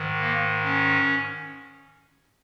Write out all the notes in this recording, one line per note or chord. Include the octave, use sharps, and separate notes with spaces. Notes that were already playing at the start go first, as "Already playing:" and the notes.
Already playing: G#2 D#3
A#3
C#4